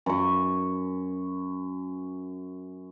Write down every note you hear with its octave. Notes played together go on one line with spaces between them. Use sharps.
F#2 C#6